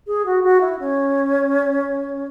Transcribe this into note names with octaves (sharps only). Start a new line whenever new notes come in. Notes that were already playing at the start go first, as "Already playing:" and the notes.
G#4
F#4
F#4
E4
C#4